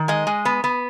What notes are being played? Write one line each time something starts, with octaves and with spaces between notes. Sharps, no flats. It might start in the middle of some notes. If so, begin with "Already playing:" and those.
Already playing: D#3
G#3 D#5
G#3
B3
B3